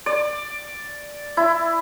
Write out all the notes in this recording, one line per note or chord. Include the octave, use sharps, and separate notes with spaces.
D5
E4